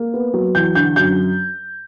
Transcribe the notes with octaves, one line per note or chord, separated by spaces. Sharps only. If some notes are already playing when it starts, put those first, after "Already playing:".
Already playing: A#3
B3
F#3
E2 G6
D3 G6
F#2 G6